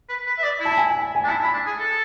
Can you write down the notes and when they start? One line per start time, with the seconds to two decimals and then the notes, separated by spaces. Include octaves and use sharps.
0.09 B4
0.26 B4
0.38 E5
0.43 D5
0.60 E4
0.65 A5
0.77 G#5
0.90 G#5
1.02 G#5
1.15 G#5
1.24 D4
1.27 E4 A5
1.41 E4
1.44 B5
1.53 D4
1.66 G#4
1.79 A4